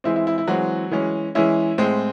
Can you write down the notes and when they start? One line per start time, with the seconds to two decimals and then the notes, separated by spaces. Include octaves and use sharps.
0.04 E3 G#3 C4 E4
0.16 E4
0.27 E4
0.38 E4
0.47 E3 F#3 G#3 C4 F#4
0.91 E3 G#3 C#4
1.35 E3 G#3 C#4 E4
1.78 A2 G#3 C4